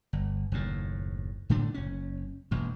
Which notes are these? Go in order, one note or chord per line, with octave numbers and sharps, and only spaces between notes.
G1
F#1 D#2 A2
A2 D3 A3 D4
F#1 C#4
E1 A#1 F2